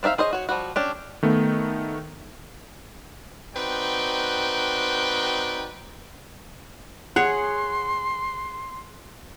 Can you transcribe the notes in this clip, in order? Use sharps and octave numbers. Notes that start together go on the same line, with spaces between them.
C4 D4 D#4 E5 F5
G#4 C5 C#5 D#5
F#4 C#5
F3 G3 F#4
C#4 D4 G4
D#3 A3 B3
C4 D#4 F#4 B4 D5 G5
G#4 C#5 F#5 C6